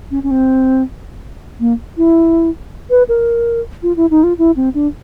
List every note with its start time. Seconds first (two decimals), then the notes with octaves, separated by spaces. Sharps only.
0.11 C#4
0.23 C#4
0.31 C4
1.60 A#3
1.97 E4
2.90 B4
3.09 A#4
3.83 F4
3.96 E4
4.10 D#4
4.23 F4
4.38 E4
4.56 C4
4.74 D4